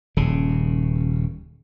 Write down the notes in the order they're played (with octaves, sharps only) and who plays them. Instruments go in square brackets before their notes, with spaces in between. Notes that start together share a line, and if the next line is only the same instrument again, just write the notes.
[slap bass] D#1 C#3